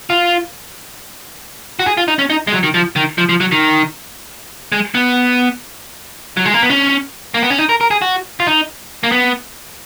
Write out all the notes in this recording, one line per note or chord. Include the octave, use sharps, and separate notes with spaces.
F4
F#4
G#4
F4
D#4
C#4
D#4
G#3
F#3
D#3
F3
D#3
F3
F3
F#3
D#3
G#3
B3
F#3
G#3
A#3
B3
C#4
A#3
B3
C#4
D#4
A#4
A#4
G#4
F#4
F4
D#4
A#3
B3